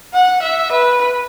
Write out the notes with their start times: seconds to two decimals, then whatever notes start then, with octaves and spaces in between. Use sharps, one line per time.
0.14 F#5
0.43 E5
0.72 B4